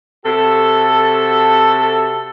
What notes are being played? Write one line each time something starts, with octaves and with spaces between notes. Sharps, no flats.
C3 F#4 A4